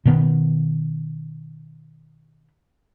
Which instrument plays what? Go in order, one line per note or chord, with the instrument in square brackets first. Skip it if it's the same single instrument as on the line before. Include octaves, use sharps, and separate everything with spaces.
[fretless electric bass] B2 D#3 B3